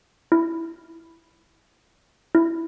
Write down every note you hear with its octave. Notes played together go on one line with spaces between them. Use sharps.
E4
E4